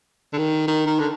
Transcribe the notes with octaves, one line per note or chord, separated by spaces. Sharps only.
D3
D#3
D#3
D#3
D3